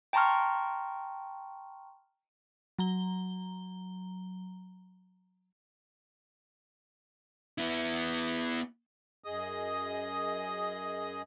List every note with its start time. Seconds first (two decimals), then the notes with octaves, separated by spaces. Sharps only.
0.13 G5 A5 A#5 C6 C#6 F6
2.79 F#3 A#5 G7
7.58 B3 E4
9.24 F#2 G#4 D#5 D#6